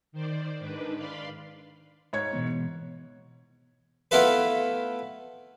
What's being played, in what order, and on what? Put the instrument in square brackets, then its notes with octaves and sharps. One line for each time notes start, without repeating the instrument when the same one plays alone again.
[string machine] D#3 C5 D5
G#2 D#3 D4 B4
D5 F5 B5 C6
[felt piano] G#2 C#5 G#6
[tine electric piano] B2 E3 B3
[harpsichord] A3 B3 E4 F4 A4 B4